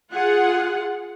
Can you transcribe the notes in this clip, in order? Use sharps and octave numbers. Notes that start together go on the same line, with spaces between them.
F4 G#4 F#5